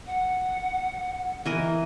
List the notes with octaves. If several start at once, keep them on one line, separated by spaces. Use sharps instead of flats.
F#5
E3 A#4 D#5